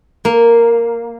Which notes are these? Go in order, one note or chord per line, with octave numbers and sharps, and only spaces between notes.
A#3